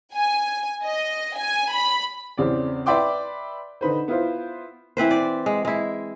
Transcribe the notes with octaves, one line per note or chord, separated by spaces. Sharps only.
G#5
D#5
G#5
B5
E2 C#3 C4 D5
B4 D5 E5 G5 C6 D6
D3 D#4 B4 C5
B3 E4 F4 C5
E3 C4 B4 C5
D5
G#3
G#3 E4